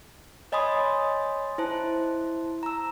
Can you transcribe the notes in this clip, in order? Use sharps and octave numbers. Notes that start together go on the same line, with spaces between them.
C#5 D#5 G#5 B5 C6 D#6
E4 C5 A5
A#5 E6